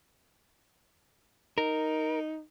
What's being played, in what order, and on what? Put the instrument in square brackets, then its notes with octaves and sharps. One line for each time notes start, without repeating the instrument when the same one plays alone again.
[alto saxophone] D#4 [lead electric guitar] A#4